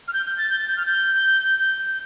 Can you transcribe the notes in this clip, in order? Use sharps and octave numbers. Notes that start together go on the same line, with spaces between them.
F6
G6
G6
A6
G6
A6
G6
F6
G6
G6